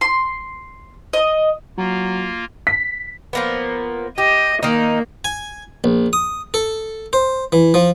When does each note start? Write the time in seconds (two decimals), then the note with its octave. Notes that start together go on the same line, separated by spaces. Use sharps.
0.01 C6
1.13 D#5
1.78 F#3 A#3 F4
2.67 B6
3.33 F3 A#3 B3
4.18 G4 D#5
4.63 D#3 A#3 D#4
5.25 G#5
5.84 A#1
6.13 D#6
6.54 A4
7.13 C5
7.52 E3
7.74 F3